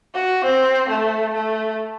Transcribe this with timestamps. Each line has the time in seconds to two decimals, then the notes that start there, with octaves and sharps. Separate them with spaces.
0.15 F#4
0.44 C4
0.89 A3
1.34 A3